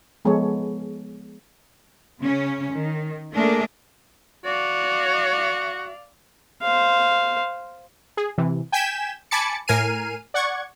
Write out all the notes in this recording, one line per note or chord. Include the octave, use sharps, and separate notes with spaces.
F3 G#3 B3 G#4 A4 C#5
C#3 C#4
D#3
A3 A#3 D4 G#4 A#4
F#4 D5 F5
C5 F5
G#4
C3 E3
G5 G#5 G6 G#6 B6 E7
G#5 A5 B5 D6 A6 C#7
A2 A#4 G#5 F6 C7 D#7
D5 F#5 C#6 G#6